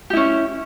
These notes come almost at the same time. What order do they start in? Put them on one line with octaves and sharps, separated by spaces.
G4 E4 C#4